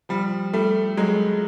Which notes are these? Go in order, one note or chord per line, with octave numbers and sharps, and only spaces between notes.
F3 G3
G3 A3
F#3 G#3